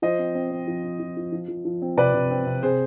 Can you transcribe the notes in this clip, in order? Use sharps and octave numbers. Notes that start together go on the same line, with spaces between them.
F3 C5 D#5
C4
C4
C4
F3
C4
F3
F3
F3
F3
F3
C4
C3 B4 D5
C3
C4
C3
C3 G#4 C5